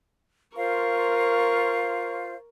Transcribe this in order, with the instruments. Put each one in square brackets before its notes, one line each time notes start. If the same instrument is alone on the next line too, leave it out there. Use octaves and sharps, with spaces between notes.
[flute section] F4 C5 F5 [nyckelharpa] A#4 C#6